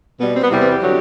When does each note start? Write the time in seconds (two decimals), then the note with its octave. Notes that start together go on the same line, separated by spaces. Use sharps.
0.19 B2 G3 B3
0.35 C4
0.43 B3
0.50 E2 C3 E3 G3 C4
0.60 C4
0.70 G4
0.82 D3 F#3